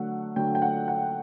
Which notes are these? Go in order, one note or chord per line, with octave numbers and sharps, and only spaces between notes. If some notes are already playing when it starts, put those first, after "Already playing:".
Already playing: D3 F#3 A3 F#5
D3 F#3 A3 G5
G5
F#5
F#5